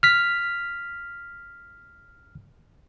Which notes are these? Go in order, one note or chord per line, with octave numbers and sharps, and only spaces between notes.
F6 B6